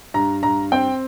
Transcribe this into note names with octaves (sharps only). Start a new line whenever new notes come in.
G2 A#5
G2 A#5
C4 G5